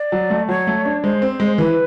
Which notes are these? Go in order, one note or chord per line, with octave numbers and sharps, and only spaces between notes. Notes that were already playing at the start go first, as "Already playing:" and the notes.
Already playing: D5
F#3
A3
F#3 C#5
A3
D4
G#3 C5
C4
G#3
E3 B4